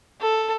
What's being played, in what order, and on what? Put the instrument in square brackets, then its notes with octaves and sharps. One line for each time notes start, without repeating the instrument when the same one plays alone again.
[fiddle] A4